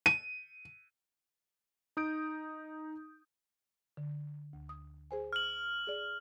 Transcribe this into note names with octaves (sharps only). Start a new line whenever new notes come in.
D#7
D#4 D#6 G6 D7
D3
D2
D#6
G#4 C5 G#5
F6 F#7
G#4 D5